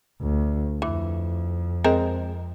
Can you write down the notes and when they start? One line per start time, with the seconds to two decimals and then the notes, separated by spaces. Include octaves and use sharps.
0.21 D2
0.82 F2 E3
1.84 G#3 C4 A#4